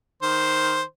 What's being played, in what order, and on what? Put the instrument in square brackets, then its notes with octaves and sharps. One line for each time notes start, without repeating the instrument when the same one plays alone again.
[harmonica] D#3 C5